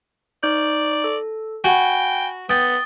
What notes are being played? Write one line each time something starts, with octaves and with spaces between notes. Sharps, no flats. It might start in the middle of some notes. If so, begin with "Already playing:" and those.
D#4 D5 G6
A4
F#4 G5 G#5 B5
B3 G5 D#6 A6